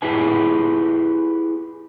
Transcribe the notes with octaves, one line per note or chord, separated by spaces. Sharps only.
E4 G4 G#4 B4 G#5